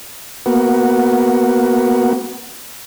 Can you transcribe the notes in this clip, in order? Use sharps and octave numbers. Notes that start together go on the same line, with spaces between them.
A#3 B3 F#4